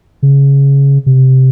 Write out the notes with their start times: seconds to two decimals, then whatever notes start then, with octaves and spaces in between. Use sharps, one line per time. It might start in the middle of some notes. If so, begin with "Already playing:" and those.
0.23 C#3
1.06 C3